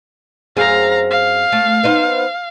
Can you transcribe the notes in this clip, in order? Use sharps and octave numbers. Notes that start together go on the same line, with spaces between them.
F#2 C4 G#4 F5 A#5
F5
A3
B3 D#4 C5